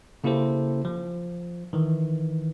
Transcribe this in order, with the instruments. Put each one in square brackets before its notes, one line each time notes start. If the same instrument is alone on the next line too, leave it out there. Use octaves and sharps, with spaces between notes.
[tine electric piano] C#3 A#3 E4 G4 A4 C5
F3
D#3 E3